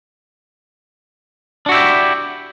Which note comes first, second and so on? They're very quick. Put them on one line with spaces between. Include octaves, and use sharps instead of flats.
D4 F#4 E4 G4